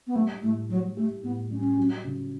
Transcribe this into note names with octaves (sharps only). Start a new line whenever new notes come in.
B3
G3 A3
A2 A3
F#3 G3
A3 G4
A2 B3
G3 C#4
F#3
C#3